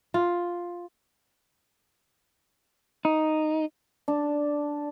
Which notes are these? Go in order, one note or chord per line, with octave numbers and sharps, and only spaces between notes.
F4
D#4
D4